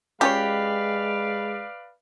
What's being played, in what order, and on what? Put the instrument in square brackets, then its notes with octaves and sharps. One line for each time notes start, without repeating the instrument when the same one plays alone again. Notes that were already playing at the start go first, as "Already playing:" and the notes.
[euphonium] G#3 [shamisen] C#4 F4 C#5 [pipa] G4 [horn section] B4 D5 F5